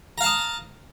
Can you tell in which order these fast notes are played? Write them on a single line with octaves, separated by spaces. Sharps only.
A#5 F5 A5 D#6